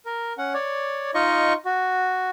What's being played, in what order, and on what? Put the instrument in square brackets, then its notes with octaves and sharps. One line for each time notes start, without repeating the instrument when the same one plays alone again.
[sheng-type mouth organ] A#4
C#4 F#5
C#5 D5
D#4 F4 D#5 C#6
F#4